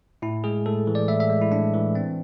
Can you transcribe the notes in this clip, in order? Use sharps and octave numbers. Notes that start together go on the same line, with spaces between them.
A2 E4
G#3 G#4
A2 A4
E3
D5
A2 E5
E5
G#3
E4
A2 D4
E3
C4